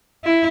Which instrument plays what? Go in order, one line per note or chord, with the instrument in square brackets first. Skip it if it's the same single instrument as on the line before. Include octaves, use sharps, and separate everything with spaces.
[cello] E4